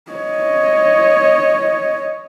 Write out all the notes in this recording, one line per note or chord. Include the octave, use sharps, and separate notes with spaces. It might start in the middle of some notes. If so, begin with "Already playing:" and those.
C#5 D#5